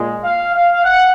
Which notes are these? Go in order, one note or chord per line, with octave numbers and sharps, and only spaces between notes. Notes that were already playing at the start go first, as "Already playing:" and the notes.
Already playing: A#2 G#3
F5
F5
F#5